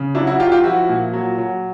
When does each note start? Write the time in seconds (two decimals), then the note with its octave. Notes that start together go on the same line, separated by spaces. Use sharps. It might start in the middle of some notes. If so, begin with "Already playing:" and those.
Already playing: C#3
0.15 F#3 D4 E4
0.27 E4 F#4
0.40 F#3 F4 G4
0.52 F4 G4
0.64 F3 E4 F#4
0.89 A#2
1.13 F#3
1.38 F#3